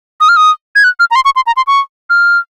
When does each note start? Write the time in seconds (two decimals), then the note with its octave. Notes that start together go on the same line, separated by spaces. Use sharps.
0.21 D#6
0.29 F6
0.36 D#6
0.75 G#6
0.84 F#6
1.00 F6
1.11 A#5
1.15 C6
1.25 C#6
1.36 C6
1.47 A#5
1.57 C6
1.67 C#6
2.10 F6